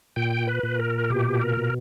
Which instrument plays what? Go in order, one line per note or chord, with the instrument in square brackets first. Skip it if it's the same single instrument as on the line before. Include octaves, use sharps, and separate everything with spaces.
[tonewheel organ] A#2 G5
B4
A#2
A#4
B2 G4
A#4
B2